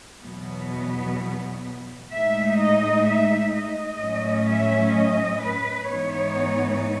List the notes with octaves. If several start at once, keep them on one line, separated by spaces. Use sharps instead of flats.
E2 B2 F#3 B3
A2 G#3 D#4 E5
D#5
E5
D#5
A2 F#3 C#4
E5
D#5
B4
G#2 E3 B3 D#4 C#5